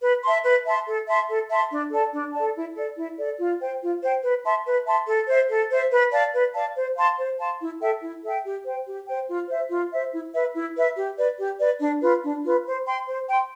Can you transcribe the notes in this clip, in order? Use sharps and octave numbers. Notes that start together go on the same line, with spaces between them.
B4
E5 A5 C6
B4
E5 A5 C6
A4
E5 A5 C6
A4
E5 A5 C6
D4
A4 D5 A5
D4
A4 D5 A5
E4
A4 D5
E4
A4 D5
F4
C5 G5
F4
C5 G5
B4
E5 A5 C6
B4
E5 A5 C6
A4
C5 E5
A4
C5 E5
B4
D5 F5 A5
B4
D5 F5 A5
C5
F5 A5 C6
C5
F5 A5 C6
E4
A4 E5 G5
E4
A4 E5 G5
G4
C5 G5
G4
C5 G5
F4
C5 E5
F4
C5 E5
E4
B4 E5
E4
B4 E5
G4
B4 D5
G4
B4 D5
D4
F4 B4
D4
F4 B4
C5
G5 C6
C5
G5 C6